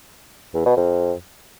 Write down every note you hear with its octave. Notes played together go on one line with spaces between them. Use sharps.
E2
B2
F2